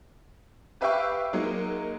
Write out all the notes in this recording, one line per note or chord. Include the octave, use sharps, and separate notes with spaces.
G4 B4 E5 F5 G5 C#6
F#3 G#3 A#3 D#4